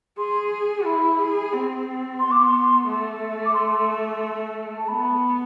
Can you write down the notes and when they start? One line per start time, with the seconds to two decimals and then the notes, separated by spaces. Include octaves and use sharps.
0.18 G#4 C6
0.85 E4 B5
1.19 G#4
1.52 C4
2.19 B3 C6
2.31 D6
2.43 C6
2.87 A3
3.46 D6
3.54 C6
4.78 A5
4.88 B3 B5